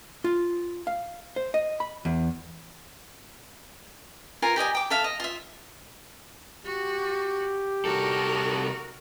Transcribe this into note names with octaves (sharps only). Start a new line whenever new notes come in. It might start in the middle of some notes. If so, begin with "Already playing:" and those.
F4
F5
C5
D#5
B5
E2
F4 A#4 G#5
G4 D5 D#5 G#5
G5 D6
A4 E5 F5
D#5
F4 E5
F#4 G4
C2 F#4 A4 A#4